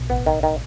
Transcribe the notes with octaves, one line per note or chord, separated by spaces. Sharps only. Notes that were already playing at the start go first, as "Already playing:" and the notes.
Already playing: B1 B2
A1 A2 B3
D#3
D#3